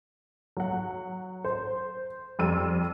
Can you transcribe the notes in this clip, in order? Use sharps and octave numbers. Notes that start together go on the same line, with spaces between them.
F#3 F#5
C5
F2 G3 E6 D#7